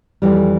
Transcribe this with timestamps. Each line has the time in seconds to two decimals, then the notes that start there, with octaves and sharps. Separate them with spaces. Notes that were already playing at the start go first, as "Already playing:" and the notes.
0.22 F2 E3 G3